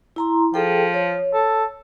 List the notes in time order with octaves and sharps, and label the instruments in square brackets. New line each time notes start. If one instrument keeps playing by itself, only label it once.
[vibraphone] E4 A#5 C6
[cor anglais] F3 [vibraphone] G#4 A4 G5
[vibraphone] C#5
[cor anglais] A4